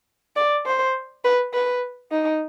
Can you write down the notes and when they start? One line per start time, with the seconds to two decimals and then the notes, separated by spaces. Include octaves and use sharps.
0.36 D5
0.66 C5
1.24 B4
1.53 B4
2.11 D#4